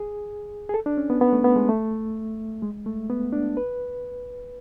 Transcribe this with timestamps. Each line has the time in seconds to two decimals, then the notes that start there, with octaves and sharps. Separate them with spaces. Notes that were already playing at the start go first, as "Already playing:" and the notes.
Already playing: G#4
0.69 G#4
0.74 A4
0.86 D4
0.97 C#4
1.10 B3
1.21 B3
1.33 A3
1.44 B3
1.56 G#3
1.69 A3
2.62 G#3
2.86 A3
3.10 B3
3.32 D4
3.57 B4